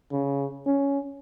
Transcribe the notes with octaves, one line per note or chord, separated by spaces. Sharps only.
C#3
C#4